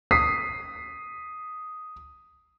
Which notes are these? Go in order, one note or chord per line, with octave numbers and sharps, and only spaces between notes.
D#6 B6 C7